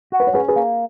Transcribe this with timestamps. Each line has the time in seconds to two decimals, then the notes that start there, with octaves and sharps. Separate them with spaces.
0.12 F#4
0.20 B4
0.27 C#5
0.34 C#4 G#4 B4
0.48 G#4 B4
0.56 A#3